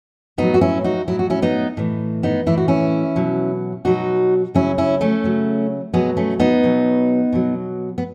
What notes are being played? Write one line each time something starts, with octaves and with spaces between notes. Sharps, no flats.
A2 F#3 B3 D#4
F#4
C#4 E4
D#4 F#4
A2 F#3 E4
F#4
C#4 E4
B3 D#4
A2 E3
B3 D#4
A2 E3 E4
F#4
C#4 E4
B2 F#3
B2 F#3 D#4 F#4
C#3 F#3 C#4 E4
C#4 E4
A3 C#4
C#3 F#3
B2 F#3 G#3 B3
A3 C#4
B3 D#4
B2 F#3
B2 F#3
B3